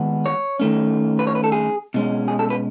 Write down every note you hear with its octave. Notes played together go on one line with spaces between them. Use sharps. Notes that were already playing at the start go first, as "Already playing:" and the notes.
Already playing: D#3 G#3 B3
C#5
D#3 A3 C#4
B4
C#5
B4
A4
G#4
B2 G#3 C#4
G#4
A4
B4